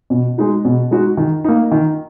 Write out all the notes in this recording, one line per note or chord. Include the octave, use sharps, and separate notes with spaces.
B2
G#3 D#4 F#4
B2
G#3 D#4 F#4
D#3
A#3 D#4
D#3